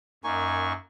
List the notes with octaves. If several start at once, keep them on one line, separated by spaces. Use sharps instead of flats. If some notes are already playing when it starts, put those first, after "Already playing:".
F#2 A#3 D#4 G#5 C#6